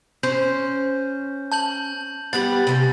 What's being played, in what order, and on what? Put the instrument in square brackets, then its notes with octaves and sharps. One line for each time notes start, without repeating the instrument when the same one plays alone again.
[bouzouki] C#4 C5 [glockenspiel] G6
[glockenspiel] A5 G6 F#7
[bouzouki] G3 B3 F#5 [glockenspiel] A6
[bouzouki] C3 C4 C#4